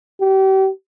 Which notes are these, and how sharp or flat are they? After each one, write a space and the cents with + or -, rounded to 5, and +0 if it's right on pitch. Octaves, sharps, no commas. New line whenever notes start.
G4 -35